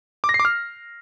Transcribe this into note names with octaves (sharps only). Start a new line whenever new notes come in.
D6
A#6
C7
D6
F6